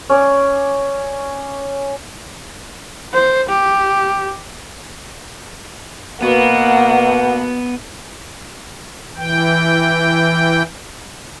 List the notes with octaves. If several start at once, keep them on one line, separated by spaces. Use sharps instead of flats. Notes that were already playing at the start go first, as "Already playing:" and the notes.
C#4 D5
C5
G4
B2 A#3 B3 F#5
E3 G5